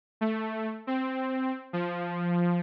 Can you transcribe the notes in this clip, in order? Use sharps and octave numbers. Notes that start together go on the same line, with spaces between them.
A3
C4
F3